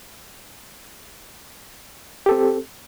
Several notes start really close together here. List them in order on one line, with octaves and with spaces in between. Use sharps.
G4 A4 C4